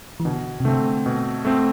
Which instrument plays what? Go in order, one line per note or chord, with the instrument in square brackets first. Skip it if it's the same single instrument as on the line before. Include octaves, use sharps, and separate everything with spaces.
[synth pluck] E3
[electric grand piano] B2 [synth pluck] D3
[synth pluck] C3
[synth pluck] D3 [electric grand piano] A3 C4
[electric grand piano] B2
A3 C4